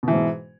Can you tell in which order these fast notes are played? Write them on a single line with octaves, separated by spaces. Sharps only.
B2 E3 G#2